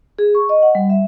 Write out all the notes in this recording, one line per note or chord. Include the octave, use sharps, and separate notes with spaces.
G#4
C#6
D#5
F#5
G3
E5